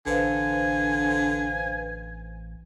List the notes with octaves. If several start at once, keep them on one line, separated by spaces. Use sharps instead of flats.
A1 D3 B4 C5 F5 G#5